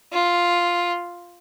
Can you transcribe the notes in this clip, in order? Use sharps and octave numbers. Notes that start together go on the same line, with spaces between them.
F4